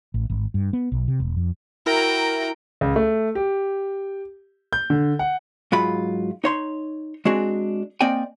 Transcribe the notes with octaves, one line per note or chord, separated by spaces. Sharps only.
A1
G#1
G2
B3
B1
C3
E1
F2
E4 F#4 A#4 G5 A#5
C#2
A3
G4
G6
D3
F#5
G#2 F#3 F4 B5
D#4 C#5 C6
G#3 C4 D4 F#4 G#4
A#3 C4 D5 D#5 G5 G#5